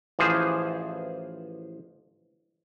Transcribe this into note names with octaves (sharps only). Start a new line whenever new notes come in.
A1 E3 F3 G#4 C5